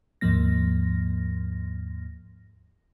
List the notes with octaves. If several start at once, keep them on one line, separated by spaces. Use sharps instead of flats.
D#2 G#2 F3 A#3 A#6